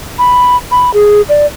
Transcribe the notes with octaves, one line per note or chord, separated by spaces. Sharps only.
B5
B5
G#4
D5